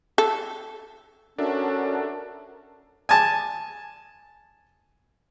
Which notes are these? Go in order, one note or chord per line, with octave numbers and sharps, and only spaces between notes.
A4
C#4 D4 F#4 A4 A#4 E5
G#5 A5